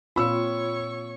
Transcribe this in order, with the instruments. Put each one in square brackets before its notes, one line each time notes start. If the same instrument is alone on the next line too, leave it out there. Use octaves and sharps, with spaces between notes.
[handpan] A#2 C4 F4 [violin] C#5 C#6 [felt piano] B5 E6